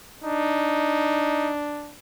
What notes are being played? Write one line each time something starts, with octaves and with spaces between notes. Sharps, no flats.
D4 D#4